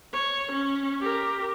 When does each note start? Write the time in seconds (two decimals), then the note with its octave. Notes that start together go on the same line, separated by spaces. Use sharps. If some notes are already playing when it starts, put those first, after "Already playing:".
0.13 C#5
0.52 C#4
1.01 G4 A#4